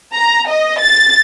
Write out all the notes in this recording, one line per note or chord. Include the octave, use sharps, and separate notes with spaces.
A#5
D#5
A6